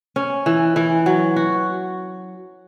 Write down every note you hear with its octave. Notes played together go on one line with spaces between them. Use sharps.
C#4
E3
E3
F#3
F#4